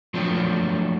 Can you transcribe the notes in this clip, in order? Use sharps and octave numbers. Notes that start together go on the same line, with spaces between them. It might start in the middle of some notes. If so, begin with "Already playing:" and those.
F3 F#3 A3 C4 D4